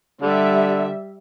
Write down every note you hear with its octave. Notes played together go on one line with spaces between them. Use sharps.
D3 G3 E5